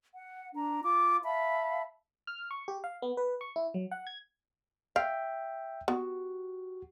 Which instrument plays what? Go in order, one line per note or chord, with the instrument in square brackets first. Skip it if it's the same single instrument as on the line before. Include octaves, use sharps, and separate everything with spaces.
[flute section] F#5
D4 A#5
F4 D6
E5 F5 A5 B5
[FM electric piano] F6
C#6
G4
F5
B3
B4
C#6
E4
F#3
F#5
G#6
[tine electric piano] E5 G5 [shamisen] F5
[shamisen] B3 [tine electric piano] F#4 G4